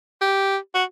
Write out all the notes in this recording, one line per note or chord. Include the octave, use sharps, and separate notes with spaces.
G4
F#4